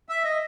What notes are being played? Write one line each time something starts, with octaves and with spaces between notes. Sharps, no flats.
E5
D#5